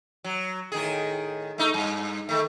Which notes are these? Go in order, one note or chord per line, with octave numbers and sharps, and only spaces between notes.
F#3
A2 D#3 G#4
A3 D#4
G2
D#3 A3